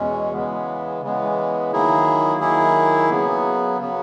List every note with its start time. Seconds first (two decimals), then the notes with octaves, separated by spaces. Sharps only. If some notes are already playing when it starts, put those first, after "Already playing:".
Already playing: E2 B2 G#3 C#4
0.33 C#3 E3 G#3 B3
1.02 C#3 E3 G#3 B3
1.72 D#3 F#3 A#3 E4 G#4
2.41 D#3 F#3 A#3 E4 G#4
3.10 C#3 F#3 B3
3.79 C#3 F#3 B3